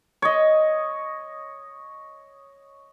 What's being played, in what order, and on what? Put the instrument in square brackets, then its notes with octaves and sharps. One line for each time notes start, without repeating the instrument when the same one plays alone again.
[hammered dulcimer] C#5 D#5